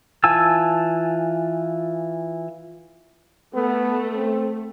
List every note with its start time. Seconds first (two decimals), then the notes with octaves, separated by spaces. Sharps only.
0.24 E3 F4 G#5 A5 E6
3.55 A3 B3
4.13 C4